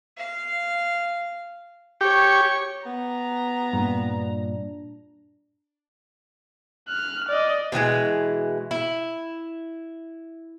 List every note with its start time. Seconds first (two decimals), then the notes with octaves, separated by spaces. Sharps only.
0.17 F5
2.01 G4 C#5 C#6
2.86 B3 A#5
3.73 G2 A#2 D4
6.89 F6 F#6
7.28 D5 D#5
7.72 B2 E3 F#3 G#3
8.71 E4